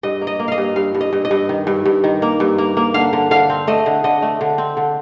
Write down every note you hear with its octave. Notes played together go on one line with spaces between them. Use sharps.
G2 D#5
A#3
D#5
A#3
D#5 F5
G2
G2 F5
G2
D#5
G2
D#5
G2
D#3
G2
G2
D#3
A#3
G2
A#3
A#3
D3 F5
D3
D3 F5
C4
A3 D#5
D3
D3 D#5
A3
D3
C4
D3